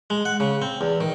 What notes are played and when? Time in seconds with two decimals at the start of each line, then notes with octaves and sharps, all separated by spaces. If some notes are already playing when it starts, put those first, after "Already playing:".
0.10 G#3
0.25 F#5
0.40 C#3
0.62 C4
0.81 E2
1.01 D#3